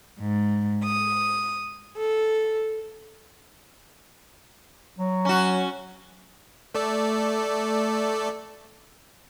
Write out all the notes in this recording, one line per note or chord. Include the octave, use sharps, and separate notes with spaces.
G#2
D#6
A4
F#3
C#4 F#4
A3 A4 D5